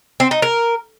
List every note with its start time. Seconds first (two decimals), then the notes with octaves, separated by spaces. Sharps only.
0.20 C4
0.31 D#4
0.42 A#4